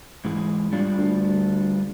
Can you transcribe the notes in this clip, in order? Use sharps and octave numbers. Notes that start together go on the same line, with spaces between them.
G#2 E3 G#3
G3 D4 F4
D2